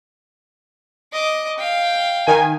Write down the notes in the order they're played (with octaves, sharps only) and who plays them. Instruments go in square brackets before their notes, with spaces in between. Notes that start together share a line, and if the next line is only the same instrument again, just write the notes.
[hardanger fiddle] D#5 D6
F5 G5
[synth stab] D#3 G#5